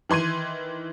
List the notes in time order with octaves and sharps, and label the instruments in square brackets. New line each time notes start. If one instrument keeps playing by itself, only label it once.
[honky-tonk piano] D#3 E3 C6 G#6 D#7